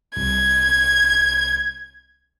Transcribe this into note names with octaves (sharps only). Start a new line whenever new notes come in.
C2 G#6